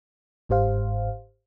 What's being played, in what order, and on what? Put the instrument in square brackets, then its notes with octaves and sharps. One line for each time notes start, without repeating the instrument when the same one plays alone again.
[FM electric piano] G1 G#2 G4 C5 F5